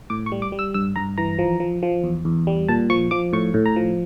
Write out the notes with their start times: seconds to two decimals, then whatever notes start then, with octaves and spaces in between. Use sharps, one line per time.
0.10 A2 D6
0.26 C#6
0.32 G3
0.42 D6
0.52 G3
0.59 E6
0.74 G2 E6
0.96 G2 A#5
1.18 E3 A#5
1.39 F3
1.60 F3
1.83 F3
2.04 E2
2.25 E2
2.47 G3
2.68 A#2 A5
2.90 F3 C#6
3.11 F3 D6
3.33 A2 C#6
3.54 A2
3.66 A#5
3.76 F3